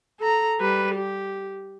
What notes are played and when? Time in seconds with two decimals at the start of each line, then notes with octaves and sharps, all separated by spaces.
0.20 A4 A#5
0.60 G3 B4
0.95 G4